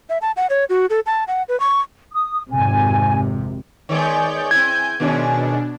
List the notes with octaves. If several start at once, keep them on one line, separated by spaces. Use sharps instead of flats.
E5
A5
F#5
C#5
F#4
A4
A5
F#5
B4
C#6
D#6
G#1 F2 C3 G#5
D#3 G#3 B3 C#5 D5 G6
C4 E4 G#5 G6 G#6
B2 D#3 G#3 C#4 D4